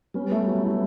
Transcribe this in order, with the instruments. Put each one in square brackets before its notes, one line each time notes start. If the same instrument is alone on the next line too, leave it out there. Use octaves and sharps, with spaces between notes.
[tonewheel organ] G3 B3 [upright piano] C#4
[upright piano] A3
F#3
E4